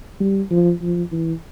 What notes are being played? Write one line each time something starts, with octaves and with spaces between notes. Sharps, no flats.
G3
F3
F3
E3